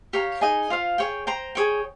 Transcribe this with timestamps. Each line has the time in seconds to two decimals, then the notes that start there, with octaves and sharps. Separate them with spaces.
0.13 G4 C#5 F5 A#5
0.41 D#4 G#4 D#5 G#5
0.70 F4 C5 F5
0.98 G#4 C#5 G5
1.27 C5 G5 A#5
1.55 G#4 C#5 G5